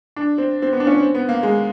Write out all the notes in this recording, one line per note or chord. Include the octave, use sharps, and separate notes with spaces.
D4
C4
C4
B3
D4
C#4
C4
B3
A#3
G#3